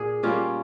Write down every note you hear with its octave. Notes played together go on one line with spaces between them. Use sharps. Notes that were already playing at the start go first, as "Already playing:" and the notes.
Already playing: A#2 G#4
G3 A#3 C#4 F4